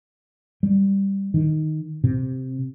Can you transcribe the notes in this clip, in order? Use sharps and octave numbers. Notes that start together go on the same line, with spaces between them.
G3
D#3
C3